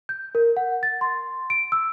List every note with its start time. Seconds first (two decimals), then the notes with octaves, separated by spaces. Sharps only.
0.09 G6
0.35 A#4
0.57 F#5
0.83 A6
1.01 C6
1.50 D7
1.72 E6